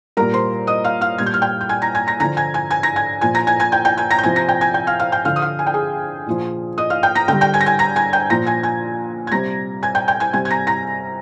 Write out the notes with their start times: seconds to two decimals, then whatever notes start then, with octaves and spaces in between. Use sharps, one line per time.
0.17 A#2 G3 A#4 A#5
0.33 C5 C6
0.67 D#5 D#6
0.84 F5 F6
1.01 F5 F6
1.18 A#2 G3 G#6
1.26 G6
1.34 F6
1.42 G5 G6
1.61 G6
1.69 G#5 G#6
1.82 A#5 A#6
1.95 G#5 G#6
2.07 A#5 A#6
2.20 D3 F3 A#5 A#6
2.37 G#5 G#6
2.54 G#5 G#6
2.71 G#5 G#6
2.83 A#5 A#6
2.96 G#5 G#6
3.21 A#2 F3 G#5 G#6
3.35 A#5 A#6
3.47 G#5 G#6
3.60 G#5 G#6
3.72 G5 G6
3.85 G5 G6
3.98 G#5 G#6
4.11 A#5 A#6
4.18 G6
4.23 C3 F3 G#5 G#6
4.36 A#5 A#6
4.49 G5 G6
4.61 G#5 G#6
4.74 G5 G6
4.87 F5 F6
5.00 F5 F6
5.12 G5 G6
5.25 D3 F3 F5 F6
5.36 D#6
5.42 F5 F6
5.59 G#5
5.67 G5
5.74 G#4 G#5
6.26 A#2 F3
6.78 D#5 D#6
6.90 F5 F6
7.03 G5 G6
7.15 A#5 A#6
7.28 D3 G5 G6
7.33 G3
7.41 G5 G6
7.54 G#5 G#6
7.61 A#6
7.66 G#5 G#6
7.79 A#5 A#6
7.96 G#5 G#6
8.13 G5 G6
8.30 A#2 F3 A#5 A#6
8.47 G#5 G#6
8.63 G#5 G#6
9.27 G#6
9.32 C3 G3 A#5 A#6
9.83 G#5 G#6
9.95 G5 G6
10.08 G5 G6
10.20 G#5 G#6
10.33 C3 G3 G#5 G#6
10.45 G#6
10.50 A#5 A#6
10.67 A#5 A#6